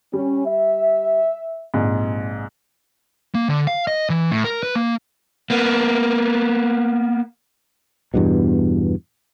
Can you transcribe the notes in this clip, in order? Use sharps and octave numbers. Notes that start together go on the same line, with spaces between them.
G3 C#4
E5
A#1 G#2 C3
A#3
D3
F5
D#5
E3
A2
A#4
B4
A#3
A#3 B3
E2 G2 B2